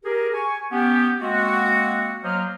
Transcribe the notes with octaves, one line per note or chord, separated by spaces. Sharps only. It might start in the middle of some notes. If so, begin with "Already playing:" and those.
G4 G#4 A#4
G#5 C#6
B3 C#4 G4
G#3 A#3 C4 F#4
F#3 A#3 C5 D#5 F6